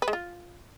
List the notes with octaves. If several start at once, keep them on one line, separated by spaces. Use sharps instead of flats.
B4
G#3
F4